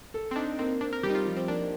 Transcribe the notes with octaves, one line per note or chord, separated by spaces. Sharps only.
A4
C4
D4 D#4
A#3 C4
C4 D4
A#4
G3 G4
D#4
F4
F3
C4
A#3 D4